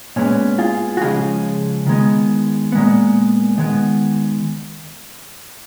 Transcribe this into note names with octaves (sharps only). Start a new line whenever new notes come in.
A#2 G#3 B3 C#4
F4 G#4
F#4
C#3 F3 G#3 F4 G#4
D#3 G#3 B3
A#2 G#3 B3
D#3 G#3 B3